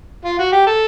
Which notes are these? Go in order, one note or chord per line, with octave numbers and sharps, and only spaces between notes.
F4
F#4
G4
A4